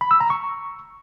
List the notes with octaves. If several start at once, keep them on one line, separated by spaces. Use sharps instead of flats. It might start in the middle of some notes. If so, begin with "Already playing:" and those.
B5
E6
A#5
C#6